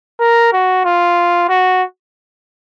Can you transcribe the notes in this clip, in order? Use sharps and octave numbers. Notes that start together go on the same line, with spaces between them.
A#4
F#4
F4
F#4